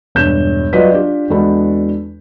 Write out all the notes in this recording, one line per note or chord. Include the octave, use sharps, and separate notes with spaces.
E1 G2 G6 E7
F#3 F4 B4 D5 D#5 B6
D4 F4 G4
E2 G#3 D4 F#4 A4 B5